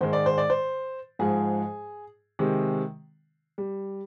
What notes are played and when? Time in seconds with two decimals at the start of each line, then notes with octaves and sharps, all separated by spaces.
0.01 G#2 D#3 G#3 C5
0.13 D5
0.26 C5
0.38 D5
0.50 C5
1.19 G#2 F3 G#3 G#4
2.39 C3 D#3 G#3
3.58 G3